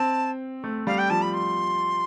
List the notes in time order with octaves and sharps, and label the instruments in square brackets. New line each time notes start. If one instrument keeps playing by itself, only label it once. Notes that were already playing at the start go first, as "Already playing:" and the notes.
Already playing: [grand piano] C4 [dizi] A5
[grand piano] A3
[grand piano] G3 [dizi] F5
[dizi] G5
[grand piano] F3 [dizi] A5
[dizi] B5
C6